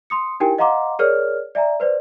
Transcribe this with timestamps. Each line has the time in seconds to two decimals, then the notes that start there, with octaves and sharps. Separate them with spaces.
0.10 C6 D#6 C#7
0.40 D#4 E4 G4 A#4 G5 G#5
0.58 D#5 F5 F#5 A#5 C6 D6
0.99 G#4 A#4 C#5 D5 F6
1.55 D5 E5 G#5 A#5
1.80 B4 C5 D5